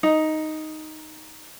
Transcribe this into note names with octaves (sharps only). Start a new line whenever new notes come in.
D#4